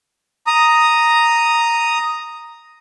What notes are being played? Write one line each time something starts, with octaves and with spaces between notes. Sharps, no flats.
A#5 D#6